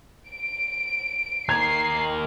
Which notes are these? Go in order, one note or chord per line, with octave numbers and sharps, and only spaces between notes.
D7
D#2 A#4 G#6 C7